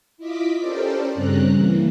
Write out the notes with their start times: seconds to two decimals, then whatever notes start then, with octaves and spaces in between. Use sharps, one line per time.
0.17 E4 F4 D#5 D6 B6
0.59 C#4 G4 A4 A#4 C5 D5
1.15 G2 C#3 C4 C#4 A#5 F#6
1.52 E3 A#3